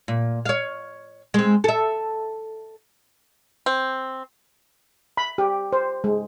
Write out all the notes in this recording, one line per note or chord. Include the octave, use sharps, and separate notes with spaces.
A#2
C#5 F5
G#3 C4
A4 E5
C4
B5
G4
C5
G#3